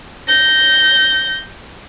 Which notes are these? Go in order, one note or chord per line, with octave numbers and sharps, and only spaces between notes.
G6 A#6